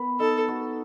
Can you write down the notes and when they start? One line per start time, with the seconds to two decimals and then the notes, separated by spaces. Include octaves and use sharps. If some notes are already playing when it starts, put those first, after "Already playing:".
Already playing: B3 B4
0.20 D#4 A4
0.48 F#4